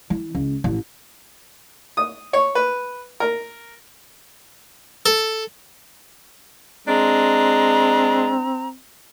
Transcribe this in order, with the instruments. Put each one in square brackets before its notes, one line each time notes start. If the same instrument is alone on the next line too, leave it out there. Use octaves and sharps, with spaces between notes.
[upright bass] E3
C#2
A1
[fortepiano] D#6
C#5
B4
A#4
[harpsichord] A4
[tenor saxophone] G#3 [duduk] C4 [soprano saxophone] D4 [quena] A#5